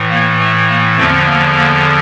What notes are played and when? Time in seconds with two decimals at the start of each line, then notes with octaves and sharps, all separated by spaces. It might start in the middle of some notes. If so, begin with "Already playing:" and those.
Already playing: A2 E3
0.09 A#3
0.39 A3
0.68 A#3
0.96 E2 D3 F3 A3 C4
1.26 A#3
1.55 A#3